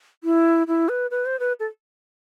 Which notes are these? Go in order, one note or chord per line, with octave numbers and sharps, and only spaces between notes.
E4
E4
B4
B4
C5
B4
A4